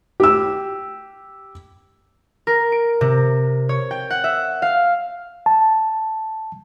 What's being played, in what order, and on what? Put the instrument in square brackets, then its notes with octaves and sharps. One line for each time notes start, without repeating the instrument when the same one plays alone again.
[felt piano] G4 E6
[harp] A#4
D7
C3
C#5
G5
F#5
E5
F5
[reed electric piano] A5